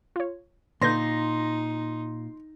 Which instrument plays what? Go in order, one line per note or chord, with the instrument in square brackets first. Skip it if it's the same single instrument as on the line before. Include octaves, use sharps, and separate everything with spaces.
[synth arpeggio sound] F4 C#5
[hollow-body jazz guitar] A#2 [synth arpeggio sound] D3 B4 G6 [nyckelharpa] D#4 [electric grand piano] C6 A#6